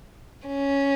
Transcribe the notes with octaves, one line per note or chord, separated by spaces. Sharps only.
C#4